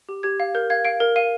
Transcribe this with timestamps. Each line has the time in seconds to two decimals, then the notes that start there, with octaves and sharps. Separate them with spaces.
0.09 G4
0.23 G4 G#6
0.40 F5
0.55 A#4 G6
0.70 F5 G#6
0.85 F5 D7
1.00 A#4
1.16 F5 D#7